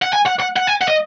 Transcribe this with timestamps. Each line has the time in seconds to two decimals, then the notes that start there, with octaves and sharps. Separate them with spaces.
0.02 F#5
0.13 G#5
0.26 F#5
0.40 F#5
0.57 F#5
0.67 G#5
0.82 F#5
0.88 D#5